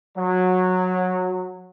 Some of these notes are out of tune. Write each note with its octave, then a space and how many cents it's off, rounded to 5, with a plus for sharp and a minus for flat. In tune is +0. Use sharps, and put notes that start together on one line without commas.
F#3 -15